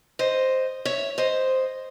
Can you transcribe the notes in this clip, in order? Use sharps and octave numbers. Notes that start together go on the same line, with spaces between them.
C5 D#5
C#5 E5
C5 D#5